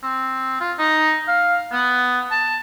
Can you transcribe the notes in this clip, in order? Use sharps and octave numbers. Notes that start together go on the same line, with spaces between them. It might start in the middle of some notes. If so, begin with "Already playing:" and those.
C4
F4
D#4
F5
B3
A5